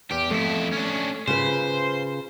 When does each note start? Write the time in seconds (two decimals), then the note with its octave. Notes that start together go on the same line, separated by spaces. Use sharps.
0.11 E2 G4
0.30 F2 A3 E4
0.72 C#4 D4
1.27 C#3 F4 B4 C5